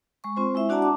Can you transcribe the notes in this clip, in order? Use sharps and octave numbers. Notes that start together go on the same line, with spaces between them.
G#3 C#6
C4 F4 C5
G#3 E4 E5
D4 F#4 D5 F#5 A5 A#5
D6